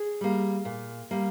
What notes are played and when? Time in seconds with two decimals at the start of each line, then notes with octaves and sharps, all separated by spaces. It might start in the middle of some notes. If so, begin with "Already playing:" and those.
Already playing: G#4
0.21 G3 A#3
0.65 A#2
1.11 G3 A#3